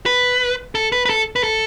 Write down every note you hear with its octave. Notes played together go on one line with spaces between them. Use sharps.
B4
A4
B4
B4
A4
B4
A4